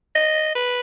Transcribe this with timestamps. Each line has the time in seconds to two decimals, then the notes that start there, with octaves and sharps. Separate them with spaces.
0.15 D#5
0.55 B4